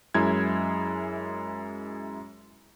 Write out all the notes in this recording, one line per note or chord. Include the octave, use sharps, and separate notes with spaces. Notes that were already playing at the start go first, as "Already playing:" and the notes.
F#2 G#3 E4 G#6